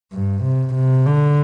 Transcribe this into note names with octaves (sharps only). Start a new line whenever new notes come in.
G2
C3
C3
D3